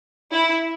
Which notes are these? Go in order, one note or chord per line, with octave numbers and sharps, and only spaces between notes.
E4